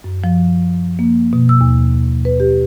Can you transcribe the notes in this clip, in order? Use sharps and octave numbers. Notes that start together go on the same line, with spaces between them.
F#2
F3
A#3
B2
E6
D#2
B4
G4